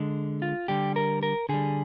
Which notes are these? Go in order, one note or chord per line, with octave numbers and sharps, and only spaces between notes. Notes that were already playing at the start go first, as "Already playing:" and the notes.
Already playing: D3 G#3
F4
D3 G3 G4
A#4
A#4
D3 G3 G#4